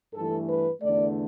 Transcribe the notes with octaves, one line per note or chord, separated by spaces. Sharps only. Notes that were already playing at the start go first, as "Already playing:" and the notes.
G2 E3 A3 A4
B4
E2 D3 A3 D5